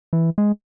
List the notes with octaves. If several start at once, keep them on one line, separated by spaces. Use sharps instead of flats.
E3
G#3